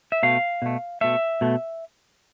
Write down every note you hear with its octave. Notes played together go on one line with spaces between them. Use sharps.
E5
B2 A3 F5
B2 A3
B2 A3 E5
B2 A3